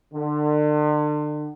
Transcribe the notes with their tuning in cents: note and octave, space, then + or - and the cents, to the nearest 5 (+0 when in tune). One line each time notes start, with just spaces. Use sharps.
D3 +35